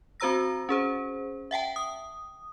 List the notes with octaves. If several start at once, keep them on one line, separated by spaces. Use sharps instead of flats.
C4 F#4 C5 A#5 E6 A#6
C#4 G#4 C5
E5 F#5 G5 A5
D#6